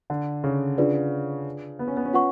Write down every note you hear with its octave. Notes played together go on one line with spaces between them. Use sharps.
D3
C#3
D4 F4 G#4 B4 D5
B3
C#4
B3
C#4
F4 B4 F#5 C#6